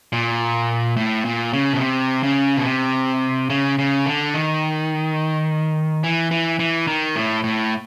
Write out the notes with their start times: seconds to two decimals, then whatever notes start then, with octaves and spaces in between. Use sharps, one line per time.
0.13 A#2
0.96 A2
1.25 A#2
1.53 C#3
1.73 B2
1.81 C3
2.23 C#3
2.57 B2
2.65 C3
3.50 C#3
3.79 C#3
4.06 D3
4.34 D#3
6.03 E3
6.31 E3
6.59 E3
6.87 D#3
7.16 A2
7.44 A2